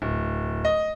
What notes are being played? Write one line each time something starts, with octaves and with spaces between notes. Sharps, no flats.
D1
D#5